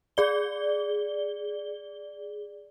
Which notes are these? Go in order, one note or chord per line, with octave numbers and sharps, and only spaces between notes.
G#4 D5 G7